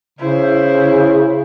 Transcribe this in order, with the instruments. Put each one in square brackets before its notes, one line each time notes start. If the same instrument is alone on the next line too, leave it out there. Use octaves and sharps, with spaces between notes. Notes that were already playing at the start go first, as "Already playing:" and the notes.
[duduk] C#3 [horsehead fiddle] E4 C5